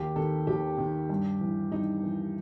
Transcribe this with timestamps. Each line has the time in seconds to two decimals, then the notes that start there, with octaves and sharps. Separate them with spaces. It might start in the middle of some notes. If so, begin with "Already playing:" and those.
Already playing: D#2 G4
0.16 D#3 A4
0.47 D#2 G4
0.78 D#3
1.10 G2
1.41 E3
1.72 G2 D#4
2.03 E3